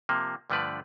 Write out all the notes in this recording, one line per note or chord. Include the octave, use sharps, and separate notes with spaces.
C3 F3 A#3
G2 D3 F3 A3 B4 D5